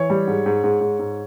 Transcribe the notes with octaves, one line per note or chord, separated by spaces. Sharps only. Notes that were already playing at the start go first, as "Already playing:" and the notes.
Already playing: E3 C#5
G3
G#2
G#2
G#2
G#2
G#2